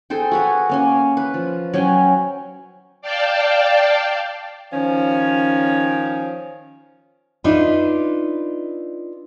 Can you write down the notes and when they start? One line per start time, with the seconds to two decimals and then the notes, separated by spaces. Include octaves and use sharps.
0.10 G#4 A4 C5 G5
0.32 F#4 B4 C#5
0.69 A#3 C#4 G#5
1.17 B4
1.34 F3
1.73 F#3 C#4 G5 G#5
3.02 D5 F5 G5 A5
4.72 D#3 F3 C#4
7.44 D4 D#4 F4 B4 E5